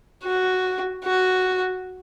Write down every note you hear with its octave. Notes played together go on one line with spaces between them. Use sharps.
F#4
F#4